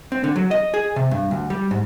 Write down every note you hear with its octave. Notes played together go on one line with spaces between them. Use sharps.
C4
D3
F#3
D#5
G#4
C3
G2
D2
G3
G#2